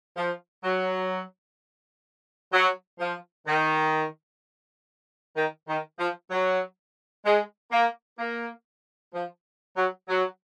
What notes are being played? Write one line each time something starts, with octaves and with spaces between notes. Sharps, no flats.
F3
F#3
F#3
F3
D#3
D#3
D#3
F3
F#3
G#3
A#3
A#3
F3
F#3
F#3